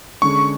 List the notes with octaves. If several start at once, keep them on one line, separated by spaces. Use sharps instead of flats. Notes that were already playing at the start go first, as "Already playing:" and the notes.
D3 G#3 C#4 C#6